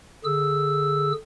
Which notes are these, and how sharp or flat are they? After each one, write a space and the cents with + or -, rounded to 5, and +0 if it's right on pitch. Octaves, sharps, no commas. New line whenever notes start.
D3 +0 G#4 -10 E6 +0